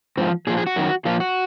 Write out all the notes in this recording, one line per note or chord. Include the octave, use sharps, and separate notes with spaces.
G#2 F3 C4
A#2 F3 G#4
G#4
F#4
F#2 D#3
A#2 F3 F4
F#4